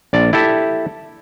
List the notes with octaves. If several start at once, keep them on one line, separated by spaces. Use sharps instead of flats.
A#1 D5
E4 G4 A4 E5